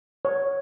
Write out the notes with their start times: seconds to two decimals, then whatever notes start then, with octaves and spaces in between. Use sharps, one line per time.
0.25 C#5